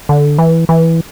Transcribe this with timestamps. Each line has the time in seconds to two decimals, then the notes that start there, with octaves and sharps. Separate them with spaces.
0.09 D3
0.38 E3
0.69 E3